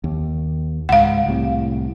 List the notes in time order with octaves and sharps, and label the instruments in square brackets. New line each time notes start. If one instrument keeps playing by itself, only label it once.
[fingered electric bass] D#2
[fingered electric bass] C#2 G#2 [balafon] F5 F#5
[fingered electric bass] C2 A2 C3